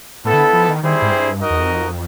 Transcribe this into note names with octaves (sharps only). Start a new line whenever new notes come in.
A2 B3 E4 A4
D3
F3
D#3
D#3 G3 C4 E4 G#4 C5
G#2
G2
D#4 F#4 A#4 D#5
E2
F2